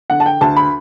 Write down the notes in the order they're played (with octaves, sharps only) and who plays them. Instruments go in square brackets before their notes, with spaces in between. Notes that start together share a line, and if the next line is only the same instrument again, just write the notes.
[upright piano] D3 F#5
A5
G5
D2 A5
B5